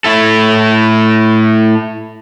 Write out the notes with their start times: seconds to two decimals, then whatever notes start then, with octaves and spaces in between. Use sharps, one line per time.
0.04 A2 E4 A4